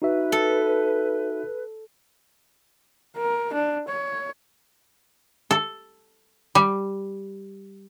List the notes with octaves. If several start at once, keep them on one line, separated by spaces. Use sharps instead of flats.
D#4 F#4 B4 E5
A4
A#4
D4
C#5
A4
G3